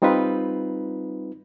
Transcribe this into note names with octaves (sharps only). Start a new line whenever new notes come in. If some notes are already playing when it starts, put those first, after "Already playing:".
G3 C4 D#4 F4 B4